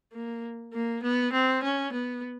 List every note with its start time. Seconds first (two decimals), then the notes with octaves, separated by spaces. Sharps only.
0.13 A#3
0.73 A#3
1.02 B3
1.32 C4
1.63 C#4
1.92 B3